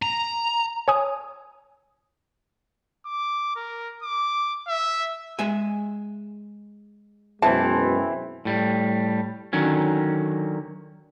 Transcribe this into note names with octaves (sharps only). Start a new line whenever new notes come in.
A#5
C#5 G#5 D#6
D6
A#4
D6
E5
G#3 E5 G#5
F#2 B2 E3 G#3 C4 A5
A2 G3
D3 D#3 F#3 C#4